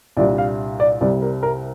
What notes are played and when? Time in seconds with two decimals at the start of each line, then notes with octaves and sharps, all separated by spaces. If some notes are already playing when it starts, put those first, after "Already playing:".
0.17 C2 A#2 G3 D4 D5
0.38 F5
0.80 D5
1.01 C2 C3 G3 D5
1.22 A#4
1.43 A#4